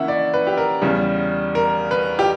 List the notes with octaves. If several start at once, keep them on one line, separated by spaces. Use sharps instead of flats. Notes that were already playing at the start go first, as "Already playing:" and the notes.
Already playing: C#3 E3 A#3 C#4 E5 F#5
D5
B4
G4
A#4
E2 C#3 G3
A#4
B4
G4